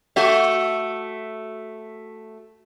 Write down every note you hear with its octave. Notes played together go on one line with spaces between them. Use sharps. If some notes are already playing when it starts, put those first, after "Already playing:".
A3 F#4 E5